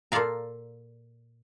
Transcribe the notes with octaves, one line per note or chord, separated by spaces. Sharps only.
A#2 F4 A4 D5 F5 A#5